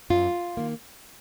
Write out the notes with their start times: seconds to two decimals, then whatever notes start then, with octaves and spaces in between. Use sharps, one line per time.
0.10 F#2 F4
0.57 D#3 A#3